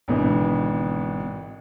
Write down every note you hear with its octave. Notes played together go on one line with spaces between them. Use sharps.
G#1 B2 D3 E3